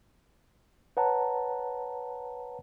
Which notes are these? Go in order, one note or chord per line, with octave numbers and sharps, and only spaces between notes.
B4 C#5 F#5 A5 A#5